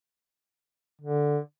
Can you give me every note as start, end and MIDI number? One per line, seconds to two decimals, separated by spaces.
1.01 1.38 50